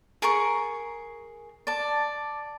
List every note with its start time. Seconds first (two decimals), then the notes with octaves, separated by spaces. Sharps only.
0.22 G#4 A#4 A#5 C#6
1.67 D5 A5